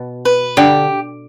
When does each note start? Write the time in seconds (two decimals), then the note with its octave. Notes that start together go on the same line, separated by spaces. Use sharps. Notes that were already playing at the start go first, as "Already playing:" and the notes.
Already playing: B2
0.25 B4
0.57 D3 G4